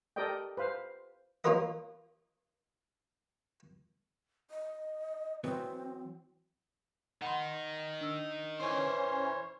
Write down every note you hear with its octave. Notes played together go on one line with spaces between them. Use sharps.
G4 A4 A#4 D5 D#5 G5
B4 C5 F5
A#3 C#4 F4 A#4 B4 D#5
D#5
E3 F#3 B3 C4
D#3 D#4 F#5 B5 C6
D4 E6
E3 C#4 C5 C#5